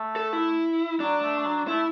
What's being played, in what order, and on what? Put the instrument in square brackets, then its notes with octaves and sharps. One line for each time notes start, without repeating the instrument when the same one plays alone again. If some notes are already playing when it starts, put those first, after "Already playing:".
Already playing: [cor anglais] A3
[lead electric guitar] A4
E4
[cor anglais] F#3 [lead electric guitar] D4
[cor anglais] A3
A3
F#3
[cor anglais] A3 [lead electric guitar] E4